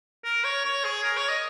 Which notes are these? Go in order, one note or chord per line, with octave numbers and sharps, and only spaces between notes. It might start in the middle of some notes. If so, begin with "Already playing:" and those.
A#4
C#5
C#5
G#4
A#4
C#5
D#5